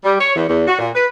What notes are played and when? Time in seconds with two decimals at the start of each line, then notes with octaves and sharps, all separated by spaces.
0.04 G3
0.19 C#5
0.35 E2
0.48 E2
0.67 F#4
0.79 A#2
0.95 B4